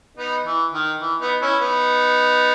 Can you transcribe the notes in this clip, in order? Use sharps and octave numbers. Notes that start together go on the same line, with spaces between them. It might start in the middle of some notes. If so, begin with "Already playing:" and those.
B3 D#4
E3
D#3
E3
B3 D#4
C#4 E4
B3 D#4